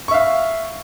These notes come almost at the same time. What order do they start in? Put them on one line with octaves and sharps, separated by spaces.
C#6 E5 F5